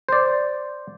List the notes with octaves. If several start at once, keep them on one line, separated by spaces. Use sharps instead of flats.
C5 D5